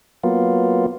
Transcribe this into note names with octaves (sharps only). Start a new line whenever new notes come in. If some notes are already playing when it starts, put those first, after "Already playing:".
F#3 A#3 B3 F4